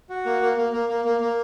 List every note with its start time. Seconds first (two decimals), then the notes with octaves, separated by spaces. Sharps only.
0.09 F#4
0.26 A#3
0.41 A#3
0.57 A#3
0.73 A#3
0.89 A#3
1.05 A#3
1.20 A#3